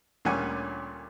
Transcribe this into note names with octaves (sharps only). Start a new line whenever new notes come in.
D2 A#2 G3 C#4 F#5 G#5